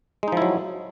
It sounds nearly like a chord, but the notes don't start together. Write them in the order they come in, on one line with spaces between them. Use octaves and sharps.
G#3 D#4 F3 E4 F#3